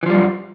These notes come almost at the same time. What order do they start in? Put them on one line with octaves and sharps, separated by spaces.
E3 F3 G3 F#2